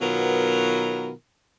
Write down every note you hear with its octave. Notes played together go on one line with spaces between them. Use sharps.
B2 D#3 F#3 B3 F4 A#4